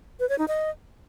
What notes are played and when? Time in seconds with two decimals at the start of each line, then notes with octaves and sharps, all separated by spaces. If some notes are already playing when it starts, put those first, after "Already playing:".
0.20 B4
0.29 C#5
0.38 D#4
0.48 D#5